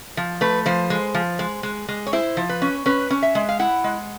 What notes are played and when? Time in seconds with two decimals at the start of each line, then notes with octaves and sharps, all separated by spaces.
0.17 F3
0.41 A3 B4
0.66 F3 C5
0.90 G#3
1.15 F3
1.39 G#3
1.63 G#3
1.89 G#3
2.07 C#5
2.13 E4 C5
2.37 F3
2.49 B4
2.62 C#4
2.86 C#4 B4
3.10 C#4
3.23 E5
3.35 G#3
3.49 F5
3.59 E4 F#5
3.84 G#3